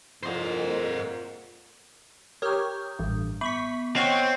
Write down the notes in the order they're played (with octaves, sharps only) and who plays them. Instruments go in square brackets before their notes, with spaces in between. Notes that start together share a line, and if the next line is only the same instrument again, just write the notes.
[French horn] F2 [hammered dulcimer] A#2 F#3 C#5 [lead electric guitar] C5 D#5
[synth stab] G4 A#4 C#5 [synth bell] D#6 G6
[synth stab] A1 G2
[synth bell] B3 [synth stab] B5 C#6 B6
[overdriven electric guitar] C4 [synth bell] C#5 D#5 F#5 [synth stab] C#6 F6